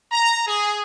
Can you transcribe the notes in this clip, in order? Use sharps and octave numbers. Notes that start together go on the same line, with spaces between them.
A#5
G#4